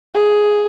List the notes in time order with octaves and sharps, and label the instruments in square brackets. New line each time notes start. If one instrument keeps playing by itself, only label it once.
[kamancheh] G#4